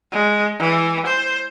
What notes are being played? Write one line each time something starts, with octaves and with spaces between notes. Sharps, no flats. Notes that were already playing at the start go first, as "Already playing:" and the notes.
G#3
E3
C5